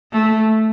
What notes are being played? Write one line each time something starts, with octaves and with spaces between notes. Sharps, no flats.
A3